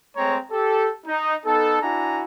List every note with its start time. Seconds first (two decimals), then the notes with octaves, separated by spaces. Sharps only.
0.17 G#3 A3 C4 C#5 A#5
0.52 G4 A4
1.06 D#4
1.46 B3 D#4 A4
1.82 D4 E4 F#4 G#5 A#5